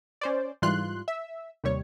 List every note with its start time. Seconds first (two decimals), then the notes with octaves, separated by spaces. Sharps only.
0.21 C#4 C5 D5
0.62 G#2 E3 G3 F4 C6 F#6
1.08 E5
1.64 D#2 C3 G3 C#5